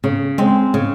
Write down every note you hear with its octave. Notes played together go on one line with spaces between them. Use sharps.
C#3
G#3 C4
C#3